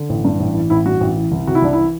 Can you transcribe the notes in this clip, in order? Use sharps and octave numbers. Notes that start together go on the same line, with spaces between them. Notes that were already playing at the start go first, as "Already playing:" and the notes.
Already playing: D3
A1
G2
A1
E3
A1 E4
G2 F#4
A1
E3
C2
C3 F#4
E4
C2 D4
E3 E4